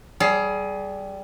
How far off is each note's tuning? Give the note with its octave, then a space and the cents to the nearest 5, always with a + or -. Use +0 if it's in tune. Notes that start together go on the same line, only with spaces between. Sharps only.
G3 -10 G#4 +20